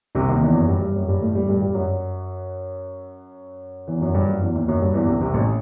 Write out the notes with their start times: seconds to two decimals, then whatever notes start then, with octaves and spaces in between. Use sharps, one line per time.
0.15 C2 C3
0.28 D#2 D#3
0.42 E2 E3
0.55 F#2 F#3
0.68 G2 G3
0.81 G2 G3
0.96 F#2 F#3
1.08 G2 G3
1.21 A2 A3
1.35 G2 G3
1.49 G2 G3
1.61 G2 G3
1.74 F#2 F#3
3.88 E2 E3
4.01 F#2 F#3
4.14 G2 G3
4.28 F#2 F#3
4.41 E2 E3
4.55 D#2 D#3
4.68 F#2 F#3
4.81 G2 G3
4.94 E2 E3
5.07 C2 C3
5.21 C2 C3
5.34 A1 A2